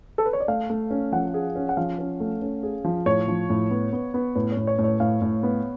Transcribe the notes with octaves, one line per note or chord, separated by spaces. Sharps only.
A4
B4
C#5
D5
A3 F5
A3
C#4
F3 F#5
G#4
C#4
F#5
F3 F5
C#4
A3
C#4
G#4
F3
A2 C#5
F3
A2
B3
B3
B3
A2 B4
A2 C#5
C#5
A2
C#5
A2 F5
A2
B3